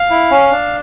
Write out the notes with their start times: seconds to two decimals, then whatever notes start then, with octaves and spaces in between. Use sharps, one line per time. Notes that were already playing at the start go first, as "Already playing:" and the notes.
Already playing: F5
0.11 E4
0.31 C#4
0.51 D4